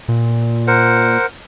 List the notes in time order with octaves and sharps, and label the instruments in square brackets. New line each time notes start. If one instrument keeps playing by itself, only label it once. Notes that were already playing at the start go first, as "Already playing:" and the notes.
[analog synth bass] A#2
[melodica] A#4 C5 F#5